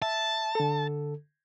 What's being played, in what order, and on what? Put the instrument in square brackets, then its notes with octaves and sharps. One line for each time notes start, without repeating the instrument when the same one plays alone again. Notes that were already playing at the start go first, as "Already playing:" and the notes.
[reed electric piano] E5 [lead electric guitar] A5
[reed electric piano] D3 A4